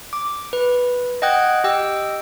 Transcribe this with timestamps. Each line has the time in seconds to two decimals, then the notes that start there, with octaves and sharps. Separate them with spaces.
0.13 D6
0.53 B4
1.22 D#5 F#5 G5 D#6 F#6 G#6
1.64 G4 D#5 G5 E6